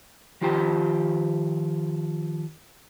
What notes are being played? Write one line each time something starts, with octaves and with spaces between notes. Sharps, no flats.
D#3 F3 F4 G4 C5 G5